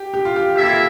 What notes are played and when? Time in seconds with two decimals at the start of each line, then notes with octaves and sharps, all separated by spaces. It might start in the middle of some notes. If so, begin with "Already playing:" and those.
Already playing: G4
0.14 G4
0.25 F4
0.36 G4
0.55 A#3 E4 G4 A4 E5
0.66 F4